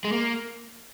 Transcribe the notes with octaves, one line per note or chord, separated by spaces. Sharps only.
G#3
A#3